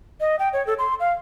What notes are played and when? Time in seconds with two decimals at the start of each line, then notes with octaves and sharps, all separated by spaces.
0.20 D#5
0.39 G5
0.53 C#5
0.67 A4
0.79 C6
1.00 F5